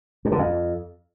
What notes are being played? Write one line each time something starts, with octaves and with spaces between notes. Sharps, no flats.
G2
D3
F2